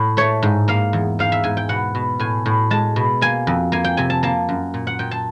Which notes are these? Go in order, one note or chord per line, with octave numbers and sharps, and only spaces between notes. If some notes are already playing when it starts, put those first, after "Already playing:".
Already playing: A2
A3 C#5
G#2
A#3 F5
E2
G#2 F5
E5
G#2 G#5
G5
B2 F#5
B2
A2 G#5
A2
G#3 A5
B2
A#3 G#5
F2
A#3 G#5
G5
C3 G#5
A5
A#3 A5
F#2
A#2
F#5
A#2 G5
A5